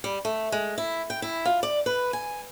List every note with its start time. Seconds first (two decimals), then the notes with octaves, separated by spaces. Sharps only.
0.04 G3
0.25 A3
0.52 G#3
0.78 E4
1.10 G5
1.22 E4
1.45 F4
1.63 D5
1.86 B4
2.13 G#5